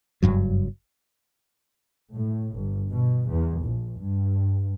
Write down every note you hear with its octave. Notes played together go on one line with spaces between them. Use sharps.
F#1 C2 G2 F#3
A2
G1
B2
E2
A#1
G2